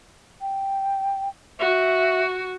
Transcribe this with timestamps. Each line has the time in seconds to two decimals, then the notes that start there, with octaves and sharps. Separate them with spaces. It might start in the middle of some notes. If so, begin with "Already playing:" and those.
0.41 G5
1.60 F#4 E5